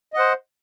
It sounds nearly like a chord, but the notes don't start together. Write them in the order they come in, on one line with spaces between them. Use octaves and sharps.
D#5 F#5 C5